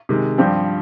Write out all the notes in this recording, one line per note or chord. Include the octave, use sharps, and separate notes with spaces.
C3 D#3 G#3
G2 F3 C4 G4